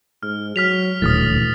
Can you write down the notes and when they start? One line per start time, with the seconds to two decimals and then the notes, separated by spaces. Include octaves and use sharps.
0.23 G#2 F6
0.56 F#3 F6 B6 F7
1.02 D#1 D2 A2 E3 D#6 F6 A6